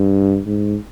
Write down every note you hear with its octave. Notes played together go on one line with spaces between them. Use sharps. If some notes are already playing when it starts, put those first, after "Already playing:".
Already playing: G2
G#2